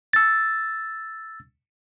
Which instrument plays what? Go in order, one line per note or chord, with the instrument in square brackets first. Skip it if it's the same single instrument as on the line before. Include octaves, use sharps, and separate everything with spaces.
[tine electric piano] E6 A6